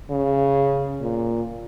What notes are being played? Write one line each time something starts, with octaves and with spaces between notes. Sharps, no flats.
C#3
A#2